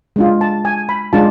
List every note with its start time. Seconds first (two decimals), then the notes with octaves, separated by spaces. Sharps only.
0.16 G#3 D4 F4
0.41 A5
0.65 G#5
0.89 B5
1.13 G#3 D4 F4 A5